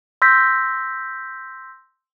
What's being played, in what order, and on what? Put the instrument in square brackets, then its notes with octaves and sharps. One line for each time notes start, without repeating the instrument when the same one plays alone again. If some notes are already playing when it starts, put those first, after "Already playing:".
[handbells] C6 E6 G6 A#6 B6